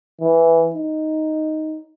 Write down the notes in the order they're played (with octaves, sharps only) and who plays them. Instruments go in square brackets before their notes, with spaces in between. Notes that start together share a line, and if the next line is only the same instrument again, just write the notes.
[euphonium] E3
D#4